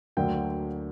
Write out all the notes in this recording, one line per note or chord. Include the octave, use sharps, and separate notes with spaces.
D2 D3 F#3 A#3 G5